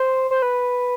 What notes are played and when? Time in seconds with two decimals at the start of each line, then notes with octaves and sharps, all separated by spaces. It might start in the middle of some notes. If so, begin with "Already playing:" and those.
Already playing: C5
0.31 C5
0.42 B4